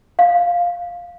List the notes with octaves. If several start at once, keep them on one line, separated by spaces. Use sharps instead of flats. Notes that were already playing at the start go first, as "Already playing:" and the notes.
F5